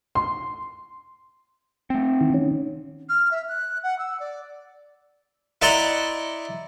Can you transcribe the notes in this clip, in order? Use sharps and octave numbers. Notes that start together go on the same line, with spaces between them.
C6
A3 C4
D#3
D#3 C#4
F6
E5
F#6
F#5
E6
D5
E4 D5 D#5 F#5 A#5 C6